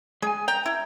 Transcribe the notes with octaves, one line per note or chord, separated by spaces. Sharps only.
G#3 G#4 G#5
G5 A#5
E4